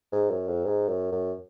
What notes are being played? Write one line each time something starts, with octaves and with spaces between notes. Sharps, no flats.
G#2
F#2
F2
G#2
F#2
F#2